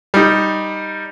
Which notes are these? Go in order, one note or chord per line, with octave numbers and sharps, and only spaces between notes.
G3 D#4